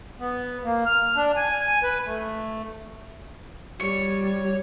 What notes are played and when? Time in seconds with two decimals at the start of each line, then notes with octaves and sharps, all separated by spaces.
0.20 B3
0.65 A#3
0.86 F6
1.16 D4
1.36 G#5
1.60 G#5
1.83 B4
2.06 A3
3.81 G3 C#5